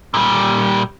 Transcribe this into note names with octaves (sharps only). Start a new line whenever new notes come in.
A#2 G3